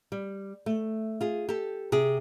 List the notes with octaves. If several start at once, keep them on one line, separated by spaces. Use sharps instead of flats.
G3
A3
F4 G#4
G4 A4
C3 G#4